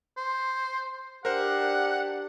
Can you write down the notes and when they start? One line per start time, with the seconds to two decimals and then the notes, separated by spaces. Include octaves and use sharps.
0.17 C5
1.25 D4 G4 A#4 C5 F#5